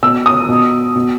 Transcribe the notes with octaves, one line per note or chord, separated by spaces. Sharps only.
B2 E6
D#6
B2
B2